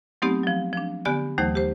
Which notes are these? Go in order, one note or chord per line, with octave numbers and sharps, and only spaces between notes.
F#3 A3 B3 C4 D#4 G4
F3 F#3
F3 D4
D3 B3 G4 D5 G#5 F#6
D#2 E3 F#3 A3 D#4 C5
G4 C5